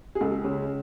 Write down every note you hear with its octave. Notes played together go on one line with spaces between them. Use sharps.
G#4
C#2 A4
C#3